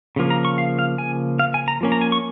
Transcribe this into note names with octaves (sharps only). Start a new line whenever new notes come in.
C#3 F3 A#3
A#5
C#6
F5
F5
G#5
F5
G#5
A#5
F3 A#3 C#4
A#5
G#5
C#6